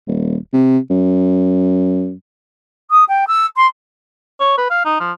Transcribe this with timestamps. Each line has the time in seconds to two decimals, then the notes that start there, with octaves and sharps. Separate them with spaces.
0.07 D#1
0.53 C3
0.90 F#2
2.91 D#6
3.08 G5
3.27 E6
3.56 C6
4.41 C#5
4.58 B4
4.70 F5
4.85 D#4
5.00 F3